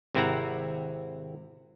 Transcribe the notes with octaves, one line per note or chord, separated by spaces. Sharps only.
G#1 C3 C4 E4 F#5 A#5